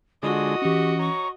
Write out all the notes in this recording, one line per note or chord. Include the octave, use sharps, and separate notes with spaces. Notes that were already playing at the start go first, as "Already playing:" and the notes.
D3 G#3 F4 F#4 D#5
E3 C#4 G4 C#6
C#5 A#5 C#6